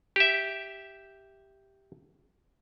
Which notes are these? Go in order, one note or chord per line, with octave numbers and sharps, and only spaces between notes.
G4 E5